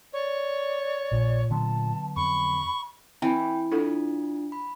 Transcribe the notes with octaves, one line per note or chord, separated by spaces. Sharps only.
C#5 D5
A#1 A#2
D3 F#3 B3 A5
F2 B5 C#6
E3 C4 G5
D4 E4 F4 A4
B5